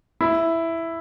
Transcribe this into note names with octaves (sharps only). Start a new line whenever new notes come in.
E4